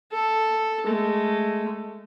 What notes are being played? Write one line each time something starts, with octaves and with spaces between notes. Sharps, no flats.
A4
G#3 A3